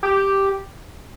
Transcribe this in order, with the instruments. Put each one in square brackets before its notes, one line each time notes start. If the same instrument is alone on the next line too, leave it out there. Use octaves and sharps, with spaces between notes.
[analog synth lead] G4